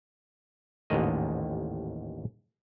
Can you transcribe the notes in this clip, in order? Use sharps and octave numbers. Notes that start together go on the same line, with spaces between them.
A1 D#2 G#2 D3 D#3 D#5